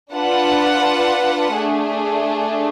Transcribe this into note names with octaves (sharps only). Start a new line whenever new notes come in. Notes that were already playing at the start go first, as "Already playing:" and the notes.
D4 F4 B4 F#5 A5
A3 D4 G#4